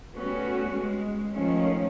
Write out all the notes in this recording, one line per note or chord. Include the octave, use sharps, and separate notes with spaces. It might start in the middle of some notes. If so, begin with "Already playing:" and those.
G3 A3 B3 C#4 F#4
G#3
D#3 F3 A3 C#4